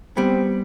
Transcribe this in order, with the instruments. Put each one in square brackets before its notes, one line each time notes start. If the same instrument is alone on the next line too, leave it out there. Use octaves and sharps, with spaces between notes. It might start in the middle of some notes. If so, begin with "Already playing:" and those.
[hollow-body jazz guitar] G3 B3 [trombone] C4